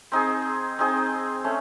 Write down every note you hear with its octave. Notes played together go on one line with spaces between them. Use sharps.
C4 D#4 G#4
C4 D#4 G#4
A3 C#4